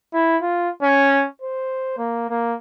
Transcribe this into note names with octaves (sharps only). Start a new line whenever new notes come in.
E4
F4
C#4
C5
A#3
A#3